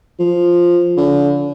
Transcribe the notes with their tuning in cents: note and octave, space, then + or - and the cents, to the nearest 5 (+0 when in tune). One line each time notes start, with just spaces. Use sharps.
F3 +0
D3 -45